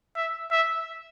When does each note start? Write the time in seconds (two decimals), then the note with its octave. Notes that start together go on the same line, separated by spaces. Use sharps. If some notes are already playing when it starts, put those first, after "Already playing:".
0.16 E5
0.51 E5